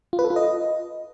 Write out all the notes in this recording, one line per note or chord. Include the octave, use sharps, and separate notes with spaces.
F4
B4
A4
F4
D#5